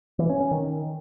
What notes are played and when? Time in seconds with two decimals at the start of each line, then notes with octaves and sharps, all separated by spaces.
0.19 E3
0.30 C#4
0.40 C#4
0.51 D#3